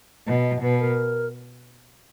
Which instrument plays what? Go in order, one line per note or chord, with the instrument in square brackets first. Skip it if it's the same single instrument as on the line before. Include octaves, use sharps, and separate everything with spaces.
[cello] B2 [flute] D#5
[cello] B2 [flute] B4
[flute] A#4